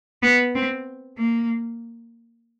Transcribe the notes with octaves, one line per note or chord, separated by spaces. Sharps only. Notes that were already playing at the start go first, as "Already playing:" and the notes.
B3
C4
A#3